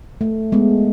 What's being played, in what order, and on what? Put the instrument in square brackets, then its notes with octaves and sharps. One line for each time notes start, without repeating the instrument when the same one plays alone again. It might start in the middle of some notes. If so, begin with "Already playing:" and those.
[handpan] A3
G#3 B3